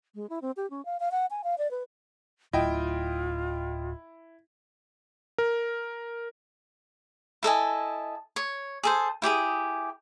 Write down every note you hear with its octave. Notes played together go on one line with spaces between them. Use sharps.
G#3
E4
C4
G4
C#4
F5
F5
F#5
G#5
F5
D5
B4
D1 E4 F4 D#5 G5
A#4
E4 A4 D#5 G#5
C#5
G#4 A4 C5
E4 G4 G#4 D#6